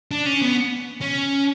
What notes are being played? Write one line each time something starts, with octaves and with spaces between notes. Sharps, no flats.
D4
C#4
B3
C#4